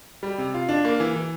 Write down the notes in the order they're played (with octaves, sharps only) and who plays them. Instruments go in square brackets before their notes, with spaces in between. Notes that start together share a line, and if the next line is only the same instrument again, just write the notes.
[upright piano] G3
C3
F4
D4
A#3
E3
E3